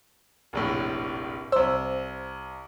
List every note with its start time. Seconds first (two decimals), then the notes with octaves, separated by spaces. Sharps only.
0.53 F1 A#1 A2
1.52 C2 C5 E6